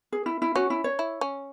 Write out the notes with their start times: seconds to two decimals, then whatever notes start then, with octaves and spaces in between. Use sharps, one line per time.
0.12 G#4
0.26 E4
0.42 E4
0.56 C#4 F#4
0.70 E4
0.84 C#5
0.99 E4
1.21 C#4